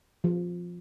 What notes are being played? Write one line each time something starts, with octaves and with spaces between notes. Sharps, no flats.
F3